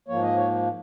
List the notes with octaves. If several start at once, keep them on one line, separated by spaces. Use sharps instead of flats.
G#2 F3 A#3 C#5
D#5
C#5